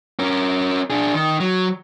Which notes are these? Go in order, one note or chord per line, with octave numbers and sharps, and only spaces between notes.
C#4 A#4
D4 G#4
D#3
F#3